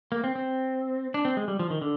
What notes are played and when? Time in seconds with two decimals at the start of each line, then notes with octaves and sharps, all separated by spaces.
0.12 A#3
0.24 C4
0.35 C4
1.14 D4
1.25 C4
1.37 G#3
1.48 G3
1.59 F3
1.70 D#3
1.81 D3